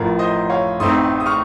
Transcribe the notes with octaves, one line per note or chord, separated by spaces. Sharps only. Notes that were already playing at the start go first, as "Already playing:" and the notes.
Already playing: A1 A2 F3 A#4
C5 D#5
C#5 F5
A1 A2 A3 C4 D#4 C6 D#6
D#6
C#6 F6